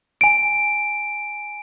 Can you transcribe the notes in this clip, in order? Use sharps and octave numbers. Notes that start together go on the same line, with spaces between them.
G#5 D7